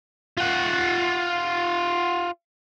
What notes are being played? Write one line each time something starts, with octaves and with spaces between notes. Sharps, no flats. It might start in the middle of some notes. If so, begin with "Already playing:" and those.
F4 F#5